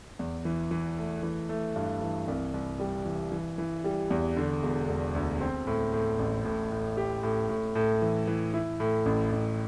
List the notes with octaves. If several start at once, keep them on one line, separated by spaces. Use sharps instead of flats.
E2
E3
E3
A3
E3
A3
G2
E3
C2
C2
G3
E3
E3
E3
G3
E2
D3
E1
E1
D2
C4
A2
A2
A1
A2
A2
G4
A2
A2
A2
E3
E3
E4
A2
A1
A1